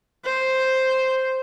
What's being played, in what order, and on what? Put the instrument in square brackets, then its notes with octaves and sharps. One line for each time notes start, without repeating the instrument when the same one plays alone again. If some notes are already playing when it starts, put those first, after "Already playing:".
[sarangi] C5